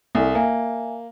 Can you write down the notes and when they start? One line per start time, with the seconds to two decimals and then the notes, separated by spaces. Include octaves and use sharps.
0.15 C2 A4 G#5 D#6
0.35 A#3 E5 G#5